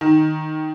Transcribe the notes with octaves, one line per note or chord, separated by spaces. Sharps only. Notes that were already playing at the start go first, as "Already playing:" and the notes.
D#3